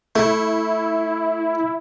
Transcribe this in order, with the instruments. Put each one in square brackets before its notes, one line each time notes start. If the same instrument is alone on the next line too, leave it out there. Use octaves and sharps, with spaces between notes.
[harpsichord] A3 [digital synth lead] E4